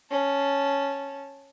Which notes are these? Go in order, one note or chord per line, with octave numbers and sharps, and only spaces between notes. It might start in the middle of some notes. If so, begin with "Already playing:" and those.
C#4 A5